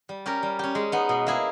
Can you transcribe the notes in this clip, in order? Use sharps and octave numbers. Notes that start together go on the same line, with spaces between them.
G3
C#4 G4 A#4
G3
C#4 G4
G#3
B3 D#4
B2
A#3 E4 G#4